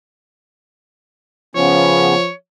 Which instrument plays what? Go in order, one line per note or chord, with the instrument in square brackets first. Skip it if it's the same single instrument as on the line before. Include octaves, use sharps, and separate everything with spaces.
[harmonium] C#3 B3 C#4 [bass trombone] F3 [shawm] C#5